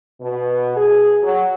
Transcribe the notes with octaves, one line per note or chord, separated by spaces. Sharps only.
B2
G#4
F#3